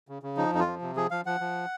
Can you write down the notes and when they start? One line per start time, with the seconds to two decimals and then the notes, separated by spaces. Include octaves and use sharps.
0.08 C#3
0.23 C#3
0.37 F3 D#4
0.53 F2 D#4
0.60 F4
0.67 F3
0.82 C3
0.96 F3 G#4
1.11 F3 F5
1.26 F3 F#5
1.41 F3